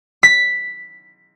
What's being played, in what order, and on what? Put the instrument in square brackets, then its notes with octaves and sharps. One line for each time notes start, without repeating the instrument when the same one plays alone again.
[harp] B6